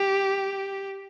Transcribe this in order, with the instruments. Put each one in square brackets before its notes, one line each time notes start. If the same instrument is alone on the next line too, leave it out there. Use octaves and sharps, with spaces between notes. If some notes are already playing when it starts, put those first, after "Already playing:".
Already playing: [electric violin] G4